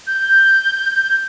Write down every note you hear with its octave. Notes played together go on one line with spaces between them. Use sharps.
G6